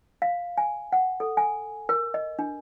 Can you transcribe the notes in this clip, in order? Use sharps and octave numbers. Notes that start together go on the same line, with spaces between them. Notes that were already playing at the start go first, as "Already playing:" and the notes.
F5
G#5
F#5
A4
G#5
A#4
D#5
D4